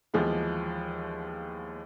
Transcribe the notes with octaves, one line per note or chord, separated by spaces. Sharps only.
D#2 E3 F3 G#3 B3